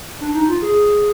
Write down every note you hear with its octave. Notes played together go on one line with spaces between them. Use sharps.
D4
D#4
F4
G#4